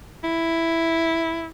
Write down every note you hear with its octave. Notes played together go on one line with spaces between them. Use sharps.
E4